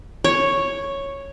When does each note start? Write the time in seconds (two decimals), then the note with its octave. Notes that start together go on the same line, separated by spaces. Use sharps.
0.24 C#5